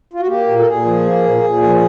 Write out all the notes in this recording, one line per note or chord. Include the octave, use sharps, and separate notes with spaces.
F4
F#4
A#3 G4
A#2
A4
A#2 G#4
F3
A#3
A#2
A#2
F3